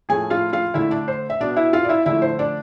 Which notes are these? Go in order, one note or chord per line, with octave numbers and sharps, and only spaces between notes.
A2 F3 A3 G#4 G#5
F4 F5
F4 F5
D3 A3 E4 E5
D4 D5
C5
E5
B2 B3 D4 D5
E4 E5
F4 F5
D5
E4 E5
D3 F3 A3 E4 E5
C5
D4 D5